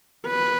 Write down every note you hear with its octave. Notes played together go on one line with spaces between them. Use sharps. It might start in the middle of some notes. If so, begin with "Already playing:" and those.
B4